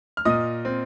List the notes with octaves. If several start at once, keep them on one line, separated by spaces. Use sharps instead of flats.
F6
A#2 D#5 D#6
C4